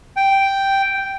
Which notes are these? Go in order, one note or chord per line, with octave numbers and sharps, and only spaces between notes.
G5